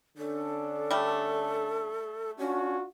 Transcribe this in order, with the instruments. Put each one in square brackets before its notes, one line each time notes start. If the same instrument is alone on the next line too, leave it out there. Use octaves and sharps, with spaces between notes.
[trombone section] D3 C#4 D4 [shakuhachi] A4
[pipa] G3 A3
[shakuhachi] C#4 [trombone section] D4 F4 F#4